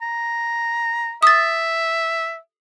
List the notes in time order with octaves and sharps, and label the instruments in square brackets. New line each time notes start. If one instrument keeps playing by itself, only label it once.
[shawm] A#5
[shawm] E5 [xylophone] D#6 A6